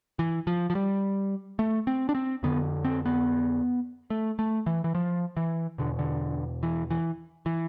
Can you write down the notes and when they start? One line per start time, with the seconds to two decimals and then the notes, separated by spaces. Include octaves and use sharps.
0.19 E3
0.47 F3
0.70 F3
0.75 G3
1.59 A3
1.87 C4
2.09 D4
2.15 C4
2.43 F2 D3 B3
2.85 C4
3.05 B3
4.10 A3
4.39 A3
4.66 E3
4.84 E3
4.95 F3
5.37 E3
5.78 E2 B2 D3
5.99 D3
6.63 E3
6.90 E3
7.46 E3